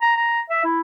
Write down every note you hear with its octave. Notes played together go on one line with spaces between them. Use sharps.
A#5
A#5
E5
E4